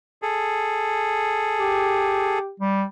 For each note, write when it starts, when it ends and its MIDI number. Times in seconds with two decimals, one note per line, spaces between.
0.22 2.39 68
0.22 2.39 69
1.59 2.52 67
2.60 2.84 55